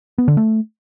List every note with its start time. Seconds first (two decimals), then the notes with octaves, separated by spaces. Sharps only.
0.18 B3
0.28 D3
0.37 A3